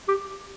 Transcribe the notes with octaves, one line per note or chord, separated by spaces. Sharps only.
G4